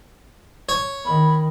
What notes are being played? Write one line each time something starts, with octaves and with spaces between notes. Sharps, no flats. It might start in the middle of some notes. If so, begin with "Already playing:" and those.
C#5
D#3 B5